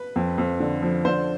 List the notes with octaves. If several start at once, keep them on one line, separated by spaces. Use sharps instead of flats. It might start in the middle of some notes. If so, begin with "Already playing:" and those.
Already playing: B4
F2
F2
D3
F3
D3 C5